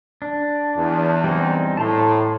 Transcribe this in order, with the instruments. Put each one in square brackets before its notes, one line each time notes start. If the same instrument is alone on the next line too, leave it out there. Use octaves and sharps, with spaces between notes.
[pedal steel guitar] D4
[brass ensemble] E2
[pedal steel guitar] G3 C4 D#4
[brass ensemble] A2 [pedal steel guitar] A5 A#5 C6